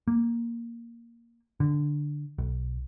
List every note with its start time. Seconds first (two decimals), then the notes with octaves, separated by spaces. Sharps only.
0.08 A#3
1.60 D3
2.38 B1